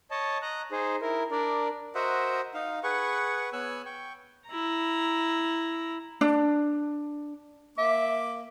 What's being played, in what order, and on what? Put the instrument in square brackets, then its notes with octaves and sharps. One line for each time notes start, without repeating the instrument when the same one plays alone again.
[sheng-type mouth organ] C#5 D#5 A5
D#5 A#5 F#6
D#4 G#4 C5
E4 A#4
D4 A#4 D5
F#4 A#4 C5 D#5 E5 F#5
D#4 F5
G#4 B4 F#5 C#6
B3 C#5 G#5 E6 F#6
G5 C#6
[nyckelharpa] E4 A#5
[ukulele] D4
[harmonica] A#3 D6 [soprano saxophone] E5